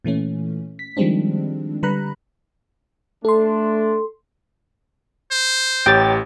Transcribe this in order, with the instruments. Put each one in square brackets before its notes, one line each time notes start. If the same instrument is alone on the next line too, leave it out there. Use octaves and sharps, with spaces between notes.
[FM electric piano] A#2 E3 A3 C#4
B6
D#3 F3 G3 G#3 C4 D4
D3 G3 B4 A#5 B5 F#6
[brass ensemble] A3 D4 [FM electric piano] A4 C6
[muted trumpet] C5
[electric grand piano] A1 G4 C#5 [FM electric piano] G5 A6